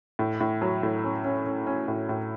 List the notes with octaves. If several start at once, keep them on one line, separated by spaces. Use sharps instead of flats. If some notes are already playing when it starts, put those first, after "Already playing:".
A2
A2
F#3
A2
C#4
C#4
C#4
C#4
A2
A2